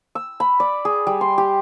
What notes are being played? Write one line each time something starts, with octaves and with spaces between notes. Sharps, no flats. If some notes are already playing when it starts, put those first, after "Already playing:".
E6
B5
D5
G#4
G3
C6
G4